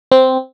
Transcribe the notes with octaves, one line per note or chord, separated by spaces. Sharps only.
C4